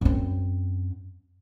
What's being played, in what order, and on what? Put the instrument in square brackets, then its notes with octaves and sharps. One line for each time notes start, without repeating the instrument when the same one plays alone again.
[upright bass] F#2 C4